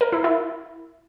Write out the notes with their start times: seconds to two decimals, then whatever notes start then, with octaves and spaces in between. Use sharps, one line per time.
0.01 A#4
0.12 E4
0.24 E4